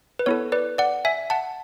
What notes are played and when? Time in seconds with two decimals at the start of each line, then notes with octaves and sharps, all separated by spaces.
0.19 B4
0.26 B3 E4 A4 C#5
0.52 B4 D5
0.78 D5 F#5
1.05 E5 G#5
1.30 F#5 A5